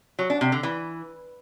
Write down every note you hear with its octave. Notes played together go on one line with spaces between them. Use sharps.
F#3
D4
C3
D3
E3